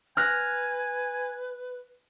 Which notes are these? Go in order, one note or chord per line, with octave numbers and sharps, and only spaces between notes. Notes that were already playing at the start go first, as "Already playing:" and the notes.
B4 G#5 F6 F#6 A#6